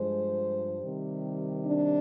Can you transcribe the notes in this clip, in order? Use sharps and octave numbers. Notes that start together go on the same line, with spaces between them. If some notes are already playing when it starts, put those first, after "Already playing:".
Already playing: G2 F3 G#3 C5
C3 D#3 G3
D4